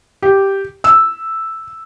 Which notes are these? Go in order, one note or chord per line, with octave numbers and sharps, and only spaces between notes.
G4
E6